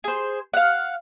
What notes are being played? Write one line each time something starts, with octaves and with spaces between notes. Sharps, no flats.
G#4 C5
F5 F#5